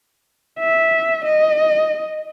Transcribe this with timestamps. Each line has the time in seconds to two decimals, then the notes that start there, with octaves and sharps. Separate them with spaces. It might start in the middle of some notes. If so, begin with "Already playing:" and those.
0.59 E5
1.25 D#5